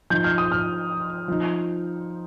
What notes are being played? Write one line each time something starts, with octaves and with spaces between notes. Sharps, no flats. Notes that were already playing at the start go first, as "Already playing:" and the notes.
F3 D#4 G6
F6
D#6
F6
F3 D#4